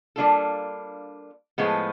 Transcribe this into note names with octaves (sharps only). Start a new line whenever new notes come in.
G3 A#3 D4 F4 A4
A2 F3 G#3 B3